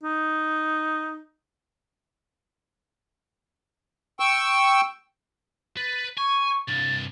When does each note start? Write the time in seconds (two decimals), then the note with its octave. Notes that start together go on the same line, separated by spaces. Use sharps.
0.03 D#4
4.20 G5 C#6 E6
5.77 B4 A6
6.18 G#5 C#6
6.68 C2 G2 A6